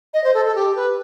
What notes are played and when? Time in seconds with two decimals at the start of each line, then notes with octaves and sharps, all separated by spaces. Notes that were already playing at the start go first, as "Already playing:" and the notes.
0.14 D#5
0.24 C5
0.34 A4
0.45 A4
0.55 G4
0.76 B4